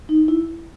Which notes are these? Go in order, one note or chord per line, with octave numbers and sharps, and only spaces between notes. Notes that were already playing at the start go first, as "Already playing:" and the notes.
D#4
E4